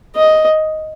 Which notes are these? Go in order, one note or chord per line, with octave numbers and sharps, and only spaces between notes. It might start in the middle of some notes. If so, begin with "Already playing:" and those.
D#5